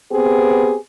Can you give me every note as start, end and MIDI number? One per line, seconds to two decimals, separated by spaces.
0.12 0.77 59
0.12 0.77 60
0.12 0.77 67
0.12 0.77 68